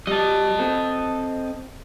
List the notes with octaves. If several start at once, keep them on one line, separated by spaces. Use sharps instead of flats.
G3 D#5 A5
C4 A4